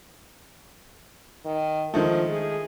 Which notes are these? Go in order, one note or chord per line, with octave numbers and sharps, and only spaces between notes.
D#3
D#3 F3 G#3 A3
G#4